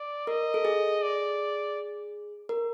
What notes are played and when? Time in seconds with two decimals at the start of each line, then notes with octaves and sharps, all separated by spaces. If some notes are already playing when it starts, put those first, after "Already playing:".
Already playing: D5
0.27 A#4 D#5
0.54 A4
0.65 G#4
1.02 D5
2.49 A#4